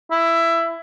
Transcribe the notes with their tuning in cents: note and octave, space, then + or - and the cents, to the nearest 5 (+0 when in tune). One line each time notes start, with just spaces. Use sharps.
E4 +15